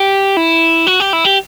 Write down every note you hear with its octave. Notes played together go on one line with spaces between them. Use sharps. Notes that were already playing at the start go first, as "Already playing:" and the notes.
Already playing: G4
E4
F#4
G4
E4
G4